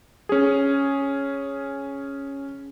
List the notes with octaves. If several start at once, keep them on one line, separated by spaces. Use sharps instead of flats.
C#4 G#4